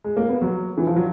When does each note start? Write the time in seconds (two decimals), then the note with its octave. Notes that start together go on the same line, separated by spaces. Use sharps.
0.04 G#3
0.17 A#3
0.29 B3
0.42 F#3
0.78 E3
0.87 F3
0.96 F#3